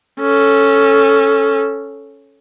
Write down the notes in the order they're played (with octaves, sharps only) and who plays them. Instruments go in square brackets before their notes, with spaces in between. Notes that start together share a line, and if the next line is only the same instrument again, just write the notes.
[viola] C#4 A4